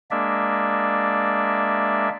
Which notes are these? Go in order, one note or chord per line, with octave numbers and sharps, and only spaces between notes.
G#3 A#3 D4 D5 E5